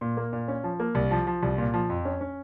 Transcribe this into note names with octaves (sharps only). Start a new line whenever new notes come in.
A#2
A#3
A#2
C#4
F3
A#3
C2
F3
F3
C2
A#2
F3
F2
C#4
C#4